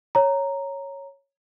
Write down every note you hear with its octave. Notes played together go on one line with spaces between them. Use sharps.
C#5 A#5